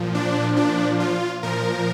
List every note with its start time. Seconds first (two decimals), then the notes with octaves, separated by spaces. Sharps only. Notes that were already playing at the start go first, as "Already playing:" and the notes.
Already playing: A#2 F3
0.15 D4
0.56 D4
1.00 F4
1.43 A#2 F3 A#4